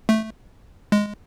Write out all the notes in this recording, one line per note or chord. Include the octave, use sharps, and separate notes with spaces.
A3
G#3